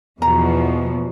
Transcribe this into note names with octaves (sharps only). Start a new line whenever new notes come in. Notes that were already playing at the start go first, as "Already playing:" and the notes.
E2 B2 F3 A#5